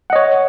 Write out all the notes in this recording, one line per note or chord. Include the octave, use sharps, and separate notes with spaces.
C#5 D#5 F#5